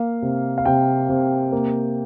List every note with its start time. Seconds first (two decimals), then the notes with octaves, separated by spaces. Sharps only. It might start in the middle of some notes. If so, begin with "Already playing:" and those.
Already playing: A#3 F5
0.22 C3
0.58 F5
0.66 C3 G5
1.09 C3
1.52 A#3